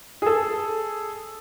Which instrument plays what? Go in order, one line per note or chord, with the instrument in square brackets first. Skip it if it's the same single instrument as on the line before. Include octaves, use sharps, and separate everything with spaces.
[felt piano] G#4 A4